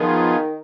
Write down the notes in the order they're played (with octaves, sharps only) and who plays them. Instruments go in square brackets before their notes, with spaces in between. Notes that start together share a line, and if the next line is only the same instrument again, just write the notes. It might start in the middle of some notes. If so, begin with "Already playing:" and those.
Already playing: [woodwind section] D#3 [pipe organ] F3 B3 F4 G#4